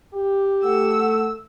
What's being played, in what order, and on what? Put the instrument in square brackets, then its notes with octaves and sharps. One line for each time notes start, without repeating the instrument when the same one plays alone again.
[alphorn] G4
[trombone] A3 [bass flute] F#5 [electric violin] E6